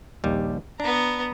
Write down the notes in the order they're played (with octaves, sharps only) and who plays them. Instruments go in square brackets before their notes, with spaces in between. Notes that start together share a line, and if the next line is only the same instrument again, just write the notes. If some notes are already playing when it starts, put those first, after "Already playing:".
[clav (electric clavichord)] A#1 D#2 G3
[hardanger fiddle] B3 A#5 [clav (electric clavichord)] D4